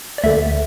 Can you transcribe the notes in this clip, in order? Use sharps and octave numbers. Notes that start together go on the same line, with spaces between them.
D5
D2 D3 E5